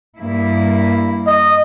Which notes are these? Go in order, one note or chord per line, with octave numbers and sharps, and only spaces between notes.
G2 A#3 E4
D#5